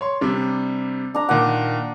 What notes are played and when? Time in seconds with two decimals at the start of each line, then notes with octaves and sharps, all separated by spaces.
0.01 C#5 C6
0.21 C3 G3 D4
1.15 D4 A#5
1.29 A#2 D#3 F#5 D6